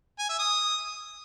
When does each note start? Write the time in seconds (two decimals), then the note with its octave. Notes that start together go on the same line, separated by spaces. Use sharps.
0.19 G#5
0.29 E5
0.39 D#6